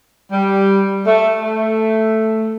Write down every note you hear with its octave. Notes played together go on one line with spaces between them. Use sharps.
G3
A3
A3